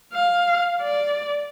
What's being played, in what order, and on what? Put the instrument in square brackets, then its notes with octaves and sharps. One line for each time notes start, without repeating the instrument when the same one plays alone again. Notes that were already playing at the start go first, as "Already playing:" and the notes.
[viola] F5
D5